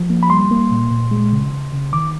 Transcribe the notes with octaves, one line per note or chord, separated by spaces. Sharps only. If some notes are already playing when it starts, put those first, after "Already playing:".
Already playing: F3
A#3
B5
G3 C6
A#3
A#2
A#2
G#3
C#3
C#3
C#3
D#3 D6